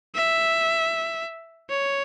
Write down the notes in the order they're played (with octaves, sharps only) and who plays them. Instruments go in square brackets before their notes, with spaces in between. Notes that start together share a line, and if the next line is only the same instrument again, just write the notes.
[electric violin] E5
C#5